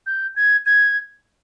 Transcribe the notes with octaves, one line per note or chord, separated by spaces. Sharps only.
G6
G#6
G#6